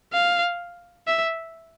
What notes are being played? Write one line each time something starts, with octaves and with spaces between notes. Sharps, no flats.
F5
E5